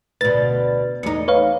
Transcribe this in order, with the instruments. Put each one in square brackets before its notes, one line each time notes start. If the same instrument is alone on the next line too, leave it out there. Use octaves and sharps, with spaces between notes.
[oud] D2 B2 [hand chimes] B4 [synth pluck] A6
[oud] E2 D#4 [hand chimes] A3 C#7
[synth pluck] B4 C#5 F5